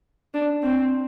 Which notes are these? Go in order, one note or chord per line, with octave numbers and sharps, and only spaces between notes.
D4
C4